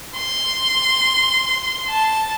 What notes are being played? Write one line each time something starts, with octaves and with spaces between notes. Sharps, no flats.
C6
A5